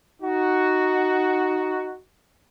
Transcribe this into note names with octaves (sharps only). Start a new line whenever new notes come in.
D#4 F#4